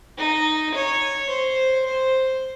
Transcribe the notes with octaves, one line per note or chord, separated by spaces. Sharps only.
D#4
C#5
C5
C5